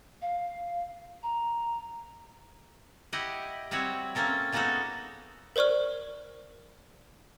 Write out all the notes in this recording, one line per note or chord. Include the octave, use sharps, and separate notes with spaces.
F5
A#5
E4 G4 D#5 F#5
G3 C4 E4 F#4 C#5
A#3 C4 C#4 A4 A#4
G#3 A#3 B3 D#4 F#4 A4
A#4 C5 D5 C#6 F6